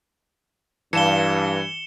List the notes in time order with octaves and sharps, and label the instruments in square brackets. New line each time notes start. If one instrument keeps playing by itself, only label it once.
[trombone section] G2 [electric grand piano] E3 [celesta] F5 A5 [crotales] C#7 E7 G7